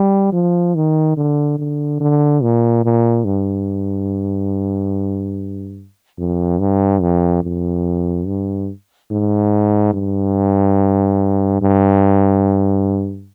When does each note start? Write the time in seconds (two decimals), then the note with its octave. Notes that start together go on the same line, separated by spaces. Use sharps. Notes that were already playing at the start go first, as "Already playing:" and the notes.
Already playing: G3
0.32 F3
0.75 D#3
1.17 D3
1.58 D3
2.00 D3
2.42 A#2
2.84 A#2
3.25 G2
6.19 F2
6.59 G2
7.02 F2
7.44 F2
8.27 G2
9.11 G#2
9.93 G2
11.62 G2